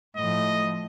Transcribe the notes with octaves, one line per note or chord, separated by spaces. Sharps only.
A2 F3 D#5